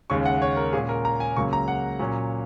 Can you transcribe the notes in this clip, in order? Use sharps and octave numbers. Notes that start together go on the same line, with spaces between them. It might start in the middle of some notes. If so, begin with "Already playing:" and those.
D#2 C#3 G#3 C#4 C#6
F#5
C#5
A#4
A#2 G#3 C#4 G#4
A#4
A#5
G#5
C#2 C#3 F#3 A#3 C#6
A#5
F#5
A#2 F#3 A#3 C#4